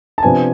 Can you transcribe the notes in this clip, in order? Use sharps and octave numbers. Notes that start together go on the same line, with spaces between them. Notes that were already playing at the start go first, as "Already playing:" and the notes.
A5
C3 F3 B3 D4 G#5